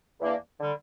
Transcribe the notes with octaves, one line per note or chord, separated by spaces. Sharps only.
E2 E3 A#3 D4
D3 G3